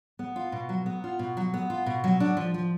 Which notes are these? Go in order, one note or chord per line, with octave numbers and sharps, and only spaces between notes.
B3
F4
B2
F#3
B3
F4
B2
F#3
B3
F4
B2
F#3
D4
F3
F3